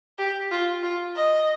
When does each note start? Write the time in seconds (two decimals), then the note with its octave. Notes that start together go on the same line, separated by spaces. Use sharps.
0.18 G4
0.51 F4
0.83 F4
1.16 D#5